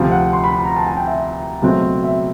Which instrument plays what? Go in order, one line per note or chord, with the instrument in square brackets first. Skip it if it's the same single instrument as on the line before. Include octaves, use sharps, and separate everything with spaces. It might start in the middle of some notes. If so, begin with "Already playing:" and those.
Already playing: [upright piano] D2 C3 F3 F5
F#5
C6
B5
B5
A#5
A5
G#5
G5
E5
C#2 B2 F#3 A3 C4
E5